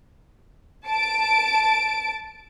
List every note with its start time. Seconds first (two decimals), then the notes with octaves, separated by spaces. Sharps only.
0.87 A5 D7